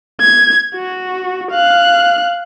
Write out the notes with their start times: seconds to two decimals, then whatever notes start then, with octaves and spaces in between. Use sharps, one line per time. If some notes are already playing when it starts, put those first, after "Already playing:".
0.21 G#6
0.75 F#4
1.52 F5 F#6